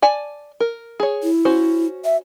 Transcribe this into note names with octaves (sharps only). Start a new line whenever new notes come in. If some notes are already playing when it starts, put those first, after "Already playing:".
D5 G#5 A5
A#4
G#4 C#5
E4
C#4 F#4 C5
E5